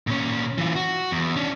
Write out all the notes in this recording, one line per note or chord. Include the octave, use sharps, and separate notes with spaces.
A#2 C#4
E3 F4
F#4
E2
C#4 D4